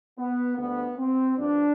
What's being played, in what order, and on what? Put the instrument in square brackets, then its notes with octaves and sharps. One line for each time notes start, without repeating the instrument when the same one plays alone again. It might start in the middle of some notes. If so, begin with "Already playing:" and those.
[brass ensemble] B3
D2 D3 G3 B3
C4
G2 F3 D4